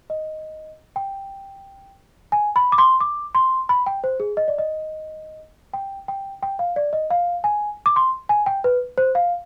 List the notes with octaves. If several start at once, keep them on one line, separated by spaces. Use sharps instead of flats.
D#5
G5
G#5
B5
D6
C6
D6
C6
B5
G5
C5
G#4
D#5
D5
D#5
G5
G5
G5
F5
D5
D#5
F5
G#5
D6
C6
G#5
G5
B4
C5
F5